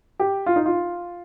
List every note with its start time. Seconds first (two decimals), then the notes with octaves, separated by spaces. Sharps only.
0.20 G4
0.46 F4
0.56 D#4
0.66 F4